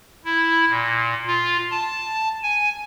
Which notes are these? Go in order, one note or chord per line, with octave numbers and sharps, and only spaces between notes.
E4
A#2
F4
A5
G#5